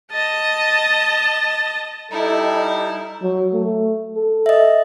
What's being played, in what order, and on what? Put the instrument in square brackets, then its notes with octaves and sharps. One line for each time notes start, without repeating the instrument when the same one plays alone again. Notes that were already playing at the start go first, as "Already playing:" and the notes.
[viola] D#5 A5
[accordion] G3 D#4 [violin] E4 [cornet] A4
[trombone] F#3
A3
A4
[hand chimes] D#5 E5